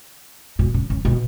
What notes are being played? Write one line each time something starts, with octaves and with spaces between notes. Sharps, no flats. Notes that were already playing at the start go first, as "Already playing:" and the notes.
B2
C#3
C#3
B2